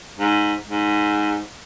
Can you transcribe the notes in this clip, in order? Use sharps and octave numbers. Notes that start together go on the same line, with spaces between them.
G#2
G#2